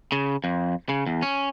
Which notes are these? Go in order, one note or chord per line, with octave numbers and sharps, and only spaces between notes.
C#3
F2
C#3
E2
C#4